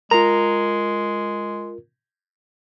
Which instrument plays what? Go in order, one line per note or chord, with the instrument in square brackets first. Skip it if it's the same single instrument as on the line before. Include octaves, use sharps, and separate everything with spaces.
[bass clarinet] G#3 [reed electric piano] F4 A#4 [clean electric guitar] A#5